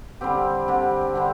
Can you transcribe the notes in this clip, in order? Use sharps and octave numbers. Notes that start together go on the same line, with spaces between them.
D3 G3 C4 G4
D3 G3 C4 G4
D3 G3 C4 G4